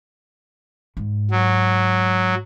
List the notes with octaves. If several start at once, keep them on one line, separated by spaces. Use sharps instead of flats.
G#2
F#3